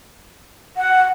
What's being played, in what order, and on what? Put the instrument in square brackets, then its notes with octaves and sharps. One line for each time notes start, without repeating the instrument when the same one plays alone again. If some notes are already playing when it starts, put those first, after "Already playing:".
[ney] F#5